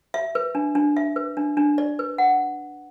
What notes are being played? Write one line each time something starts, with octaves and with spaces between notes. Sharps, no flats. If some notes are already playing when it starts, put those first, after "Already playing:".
E5
B4
D4
D4
E5
B4
D4
D4
D5
B4
F#5